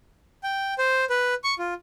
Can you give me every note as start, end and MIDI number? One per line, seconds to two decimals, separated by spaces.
0.43 0.74 79
0.78 1.05 72
1.10 1.34 71
1.44 1.55 85
1.59 1.74 65